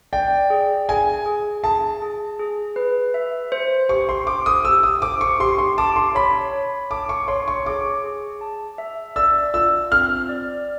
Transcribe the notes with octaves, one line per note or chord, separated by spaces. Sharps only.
D5 G5
G#4
G#4 G#5
G#4
G#4 A5
G#4
G#4
B4
E5
C5
G4 C#6
C6
C5 D6
D#6
G4 E6
D#6
C5 D6
C#6
G4 C6
C6
A5 D6
C6
C#5 B5
C#5
A5 D6
C#6
C#5 C6
C#6
G#4 D6
G#4
A5
E5
D5 E6
F4 E6
C4 F6
D5